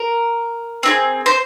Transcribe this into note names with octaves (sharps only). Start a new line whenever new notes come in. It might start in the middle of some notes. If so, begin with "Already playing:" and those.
Already playing: A#4
C4 E4 G#4
C5